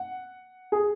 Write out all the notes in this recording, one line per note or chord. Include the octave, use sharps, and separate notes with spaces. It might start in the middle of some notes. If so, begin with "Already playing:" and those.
Already playing: F#5
G#4